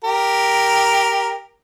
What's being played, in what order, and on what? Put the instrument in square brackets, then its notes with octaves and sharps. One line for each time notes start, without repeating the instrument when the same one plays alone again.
[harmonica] G4 A#4